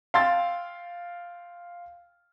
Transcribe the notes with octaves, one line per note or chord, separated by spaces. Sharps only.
F5 G5 C6 E6 A6